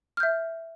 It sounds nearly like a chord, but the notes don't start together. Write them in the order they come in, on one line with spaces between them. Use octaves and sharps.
F6 G6 E5